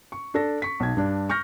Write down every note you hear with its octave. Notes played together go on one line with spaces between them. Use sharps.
C#6
D4 A4 A#6
C#6 B6
B1 G#6
G2 D4
C#6 F6 G6 A#6